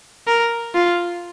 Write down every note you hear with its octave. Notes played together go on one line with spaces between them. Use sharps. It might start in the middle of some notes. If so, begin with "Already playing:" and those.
A#4
F4